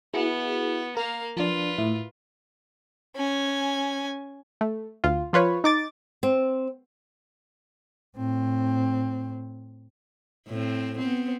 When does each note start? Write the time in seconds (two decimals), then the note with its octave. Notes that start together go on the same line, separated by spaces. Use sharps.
0.14 B3 E4 F#4 G#4
0.97 A#3 A#4 F5
1.37 F3 D4 F4 B4
1.78 A2 E4
3.16 C#4 G#5
4.61 A3
5.04 D2 F4
5.33 F3 F4 B4 C#5
5.64 D#4 D6 A6
6.23 C4
8.17 A2 C4
10.48 A2 C4
10.98 B3 C4